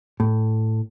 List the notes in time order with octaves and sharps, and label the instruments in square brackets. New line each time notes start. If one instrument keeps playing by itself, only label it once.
[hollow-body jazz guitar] A2